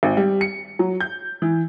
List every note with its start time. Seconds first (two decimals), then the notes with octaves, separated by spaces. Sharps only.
0.03 G#1
0.17 G3
0.41 C#7
0.79 F#3
1.00 G6
1.42 E3